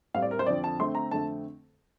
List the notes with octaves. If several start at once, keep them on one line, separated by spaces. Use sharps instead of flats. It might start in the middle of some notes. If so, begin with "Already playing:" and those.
A2 G3 C4 F5
D5
A#4
C5
F2 D3 F3 C4 D5
A5
D3 A3 C4 C6
A#5
F2 D3 A3 C4 A5